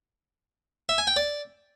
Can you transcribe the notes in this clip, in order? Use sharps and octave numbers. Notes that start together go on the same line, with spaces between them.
E5
G#5
G5
D5